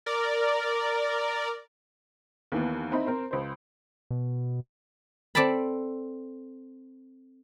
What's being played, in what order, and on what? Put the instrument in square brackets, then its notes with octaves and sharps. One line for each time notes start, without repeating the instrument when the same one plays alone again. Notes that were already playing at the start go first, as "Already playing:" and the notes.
[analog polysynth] A#4 D5
[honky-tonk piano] D#2 E3 B3
C4 D#4 E4 B5
C4 A#4 C5
C#2 C5
[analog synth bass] B2
[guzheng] C4 A4 D5 A5 B5